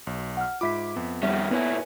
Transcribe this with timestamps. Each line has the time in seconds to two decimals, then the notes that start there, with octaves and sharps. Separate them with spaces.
0.07 B1
0.37 F#5 F6
0.61 G#2 F4 E5 B5 D6 B6
0.96 F2 B3
1.23 D#3 G3 C#4 E5 F#5
1.51 A#2 B3 E4 B4 C#5 G#5